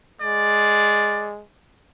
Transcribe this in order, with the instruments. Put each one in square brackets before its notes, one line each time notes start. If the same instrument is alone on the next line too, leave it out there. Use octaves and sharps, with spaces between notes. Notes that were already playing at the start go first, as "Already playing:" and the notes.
[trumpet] G#3 [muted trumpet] D5